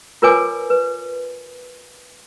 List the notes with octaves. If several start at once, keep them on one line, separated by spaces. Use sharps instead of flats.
F4 A#4 B4 C#5 G#5 D6
B4